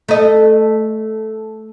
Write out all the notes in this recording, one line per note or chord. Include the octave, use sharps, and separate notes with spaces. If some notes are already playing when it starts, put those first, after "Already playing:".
A3 D#5